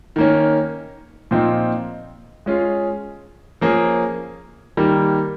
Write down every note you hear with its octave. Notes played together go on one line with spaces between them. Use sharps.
D#3 A#3 C#4
A#2 F3 C4 D#4
G#3 C#4 F4 G#4
F3 A#3 C#4 G#4
D#3 G3 A#3